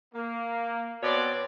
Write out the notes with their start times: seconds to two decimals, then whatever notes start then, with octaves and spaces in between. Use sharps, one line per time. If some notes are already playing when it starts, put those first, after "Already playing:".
0.15 A#3
1.03 B2 B3 C4 C#5 D5